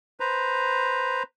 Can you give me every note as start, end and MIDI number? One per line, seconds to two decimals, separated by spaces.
0.20 1.23 71
0.20 1.23 72
0.20 1.23 82